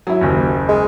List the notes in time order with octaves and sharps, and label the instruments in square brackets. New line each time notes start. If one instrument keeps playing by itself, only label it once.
[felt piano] F#3 E4
F#1 D#2
[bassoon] G#3